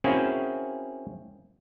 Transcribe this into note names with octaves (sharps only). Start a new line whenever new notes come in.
A#3 C4 C#4 E4 F#4 G#4